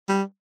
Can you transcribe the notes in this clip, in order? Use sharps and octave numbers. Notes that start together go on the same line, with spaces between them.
G3